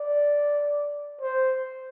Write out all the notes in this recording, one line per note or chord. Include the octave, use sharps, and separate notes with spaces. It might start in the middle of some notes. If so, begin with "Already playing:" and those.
Already playing: D5
C5